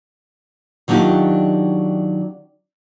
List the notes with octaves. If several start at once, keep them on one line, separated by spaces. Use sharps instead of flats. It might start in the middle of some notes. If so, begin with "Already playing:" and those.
D#3 F#3 D4 D#4 F4 G4